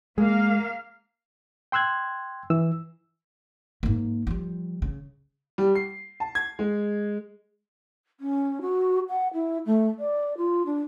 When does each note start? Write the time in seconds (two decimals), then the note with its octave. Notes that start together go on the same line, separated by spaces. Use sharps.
0.18 G#3 A#3 F5
1.72 G5 C6 E6 F#6 G#6
2.50 E3 E6
3.83 G#2 A#3
4.27 F3 G3
4.82 C#3
5.58 G3
5.75 C7
6.20 A5
6.35 G#6
6.59 G#3
8.20 C#4
8.61 F#4
9.09 F#5
9.34 E4
9.66 A3
9.99 D5
10.37 F4
10.66 D4